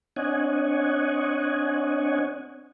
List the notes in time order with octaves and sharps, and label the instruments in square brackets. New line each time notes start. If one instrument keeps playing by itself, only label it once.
[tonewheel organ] C4 D4 C#5 D#5 F#5 G#5